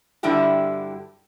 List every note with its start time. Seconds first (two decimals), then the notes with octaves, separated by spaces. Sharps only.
0.23 G2 D3 G3 E4 F#4 G4